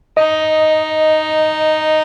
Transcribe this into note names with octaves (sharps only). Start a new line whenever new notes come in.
D#4 D#5